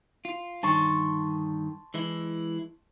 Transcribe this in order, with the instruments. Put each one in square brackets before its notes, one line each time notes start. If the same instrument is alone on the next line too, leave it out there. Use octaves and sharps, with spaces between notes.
[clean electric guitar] F4
[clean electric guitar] G2 D3 D#3 [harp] A5 C6 C#6
[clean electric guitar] E3 G#3 E4